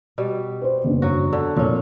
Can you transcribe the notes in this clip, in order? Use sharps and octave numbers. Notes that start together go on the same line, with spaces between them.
B2 G3
B4 C5
F#1 E2 G2
F#3 F#4
D3
F1 A#2 C#4